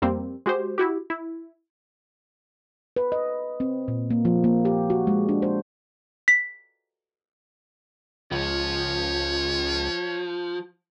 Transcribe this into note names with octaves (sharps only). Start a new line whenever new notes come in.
F2 G3 A#3 C4
G#3 F#4 G4 C5
E4 F#4 G4
E4
B4
D#5
C4
A#2
A#3
F3
A#3
G4
F#4
G#3
D4
C5
B6
C#2 F3 C#5